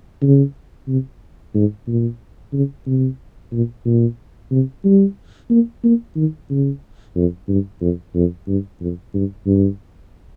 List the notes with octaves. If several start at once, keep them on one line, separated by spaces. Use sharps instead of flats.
C#3
C3
G#2
A#2
C#3
C3
A#2
A#2
C3
G3
A#3
A#3
D#3
C#3
F2
G2
F2
F2
G2
F2
G2
G2